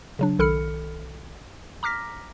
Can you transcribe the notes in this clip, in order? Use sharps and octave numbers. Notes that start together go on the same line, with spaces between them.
C#3 F#3 D4
B1 D#3 A4 B5 F6 C#7
A#5 D6 F6 A#6 B6